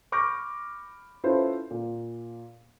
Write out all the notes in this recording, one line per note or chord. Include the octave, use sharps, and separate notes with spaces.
B5 C#6 D6 F6 G6 A#6
C#4 E4 F4 A4 B4 C5
A#2